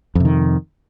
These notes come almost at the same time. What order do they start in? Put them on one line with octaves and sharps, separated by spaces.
F2 C3 D#3